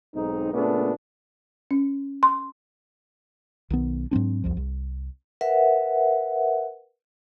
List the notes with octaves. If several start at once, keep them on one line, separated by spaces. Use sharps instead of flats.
B1 G#2 C4 D#4
A#2 C#3 A3 B3 D4
C#4
C6
B1 D#3 B3
G#2 F#3 C4 D4
C2 F2 F3
C2
A#4 B4 E5 F#5